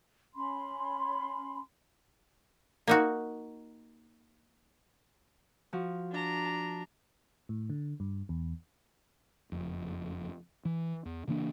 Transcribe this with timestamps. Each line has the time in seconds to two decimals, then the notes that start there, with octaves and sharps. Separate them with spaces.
0.35 C#4 B5 C6
2.88 A#3 D#4 F#4
5.73 F3 F#4
6.11 D4 A#5
6.45 A5
7.49 A2
7.70 D3
8.00 G2
8.29 E2
9.52 F#1 F2
10.65 E3
11.05 E2
11.28 C#3 E3 A#3 D4